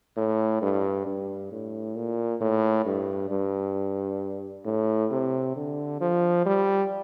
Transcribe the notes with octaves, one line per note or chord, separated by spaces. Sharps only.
A2
G2
G2
A2
A#2
A2
G2
G2
A2
C3
D3
F3
G3